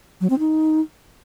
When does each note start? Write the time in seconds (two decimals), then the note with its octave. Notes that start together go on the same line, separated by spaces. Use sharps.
0.21 F#3
0.30 C4
0.39 D#4